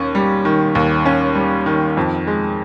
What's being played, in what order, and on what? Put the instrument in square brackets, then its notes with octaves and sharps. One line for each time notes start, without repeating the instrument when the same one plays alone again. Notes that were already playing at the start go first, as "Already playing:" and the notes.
Already playing: [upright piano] D#2 C#4
G3
D#3
D#2
C#4
G3
D#3
F2
G#3